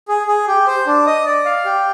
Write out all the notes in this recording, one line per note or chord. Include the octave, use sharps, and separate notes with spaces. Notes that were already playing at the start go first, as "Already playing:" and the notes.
G#4
G#4
G4
C5
D4
D#5
D5
F5
G4